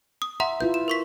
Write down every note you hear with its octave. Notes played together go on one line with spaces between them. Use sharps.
D#6
E5 F#5 A#5 C6
E4 F4 B4 G6
E7
A#4 C#6 B6